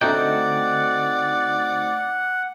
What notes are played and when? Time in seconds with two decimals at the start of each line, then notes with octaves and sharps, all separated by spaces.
0.01 D3 A3 C4 D#4 F#4 D5 F#5 G5